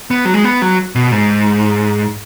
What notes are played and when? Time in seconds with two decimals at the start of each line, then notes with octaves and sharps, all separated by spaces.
0.11 B3
0.25 F#3
0.34 G#3
0.44 B3
0.62 F#3
0.95 B2
1.12 G#2